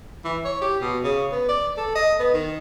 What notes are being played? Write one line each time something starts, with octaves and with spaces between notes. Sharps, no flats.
E3
C#5
G4
B2
C#3
B3
D5
A4
D#5
B3
D#3